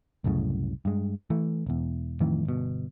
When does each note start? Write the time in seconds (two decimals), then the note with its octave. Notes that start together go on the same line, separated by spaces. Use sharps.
0.24 C2 F#2 A2 C#3
0.85 G2 G#3
1.30 E3 A3
1.66 E1 E2
2.20 F2 A2 D#3 E3
2.45 G1 B2